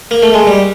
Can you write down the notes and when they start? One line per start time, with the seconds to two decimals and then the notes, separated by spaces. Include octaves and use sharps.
0.11 A#3
0.23 A3
0.34 G#3
0.47 G3